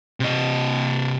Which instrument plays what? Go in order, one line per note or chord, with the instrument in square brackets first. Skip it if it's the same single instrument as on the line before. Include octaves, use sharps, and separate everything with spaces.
[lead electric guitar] C3 D#5